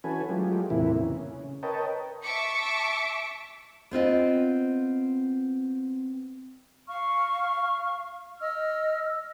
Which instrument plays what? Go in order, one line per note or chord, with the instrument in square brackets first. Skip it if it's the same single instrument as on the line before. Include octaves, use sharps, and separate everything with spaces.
[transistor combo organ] E3 C#4 F#4 A4 B4 G#5
F#3 G#3 A3 F4 G4
E2 A2 C3 E3 A#3 E4
C#3
A#4 B4 C#5 D#5 G5 A5
[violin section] E5 A5 C#6 D6 B6 C#7
[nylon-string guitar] B3 C4 F4 D#5
[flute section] F5 C#6 F6
D#5 E6 F6